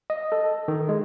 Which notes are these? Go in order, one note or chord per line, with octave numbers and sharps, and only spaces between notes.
D#5
A4
D#3
G#3